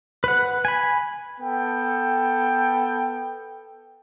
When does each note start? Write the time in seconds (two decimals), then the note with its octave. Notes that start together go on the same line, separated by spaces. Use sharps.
0.24 B4 F#5
0.65 G#5 B5
1.40 B3 A4 G5